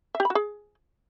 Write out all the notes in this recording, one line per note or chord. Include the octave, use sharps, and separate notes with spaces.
E5
G4
B5
F#4
G#4